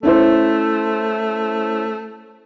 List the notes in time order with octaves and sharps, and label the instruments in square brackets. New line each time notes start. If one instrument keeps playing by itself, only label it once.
[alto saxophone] A3 [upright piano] C#4 E4 C5